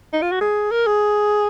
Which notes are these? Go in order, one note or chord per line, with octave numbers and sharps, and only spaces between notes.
D#4
F4
F#4
G#4
A#4
G#4